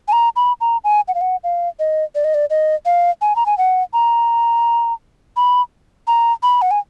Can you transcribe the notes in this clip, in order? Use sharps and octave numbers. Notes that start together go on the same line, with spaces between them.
G#5
A#5
B5
A#5
G#5
F#5
F5
F#5
F5
D#5
D5
D#5
D5
D#5
F5
G#5
A#5
G#5
F#5
A#5
B5
A#5
B5
F#5
G#5